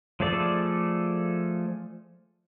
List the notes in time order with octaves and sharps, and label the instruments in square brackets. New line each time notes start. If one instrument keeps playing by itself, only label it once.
[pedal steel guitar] F3 A3 G#4 A4 D5